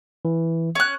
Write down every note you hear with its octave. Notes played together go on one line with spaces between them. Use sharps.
E3
C#4 F#6